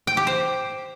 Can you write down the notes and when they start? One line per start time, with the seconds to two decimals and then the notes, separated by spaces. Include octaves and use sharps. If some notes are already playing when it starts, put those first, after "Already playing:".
0.07 G5
0.17 G4
0.27 C5